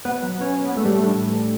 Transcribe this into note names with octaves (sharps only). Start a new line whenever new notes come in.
B2 B3 B4
F#3
B2 C#4 C#5
F#3
B3 B4
A2 A3 A4
G3 G4
E3 A3 A4
D4
A2
E3